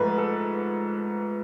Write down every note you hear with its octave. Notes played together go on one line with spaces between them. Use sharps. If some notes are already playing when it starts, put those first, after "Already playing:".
Already playing: G#2 F3 A3 B4
A4